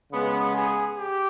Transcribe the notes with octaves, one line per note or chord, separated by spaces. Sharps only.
C#3 G#3 B3
G#4
G4